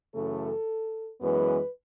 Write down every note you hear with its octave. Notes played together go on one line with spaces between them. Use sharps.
F#2 C#3 E3 A3 A4
F#2 E3 G#3 B3 B4